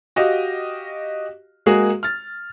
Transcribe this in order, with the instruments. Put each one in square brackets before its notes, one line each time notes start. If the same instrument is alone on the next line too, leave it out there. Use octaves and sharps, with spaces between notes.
[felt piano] F#4 G4 D#5 F5
G#3 A#3 F#4 G#4
F6 A6